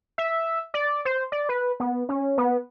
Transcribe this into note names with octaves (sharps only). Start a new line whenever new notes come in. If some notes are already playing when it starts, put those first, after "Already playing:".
E5
D5
C5
D5
B4
B3
C#4
B3